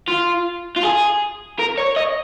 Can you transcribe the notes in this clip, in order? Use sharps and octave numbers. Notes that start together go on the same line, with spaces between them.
F4
F4
G#4
A#4
C#5
D#5